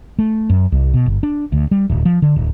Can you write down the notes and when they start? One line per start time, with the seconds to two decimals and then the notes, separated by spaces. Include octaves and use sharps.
0.19 A3
0.50 F#2
0.72 C2
0.94 B2
1.06 G1
1.23 D4
1.52 D2
1.71 G3
1.90 D1
2.05 F3
2.22 D3
2.36 D1